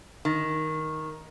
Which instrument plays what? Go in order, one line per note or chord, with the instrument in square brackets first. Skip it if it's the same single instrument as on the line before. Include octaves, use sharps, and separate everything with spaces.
[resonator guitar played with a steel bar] D#3